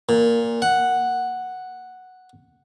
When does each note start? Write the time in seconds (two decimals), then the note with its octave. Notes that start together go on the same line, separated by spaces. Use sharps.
0.09 A#2
0.62 F#5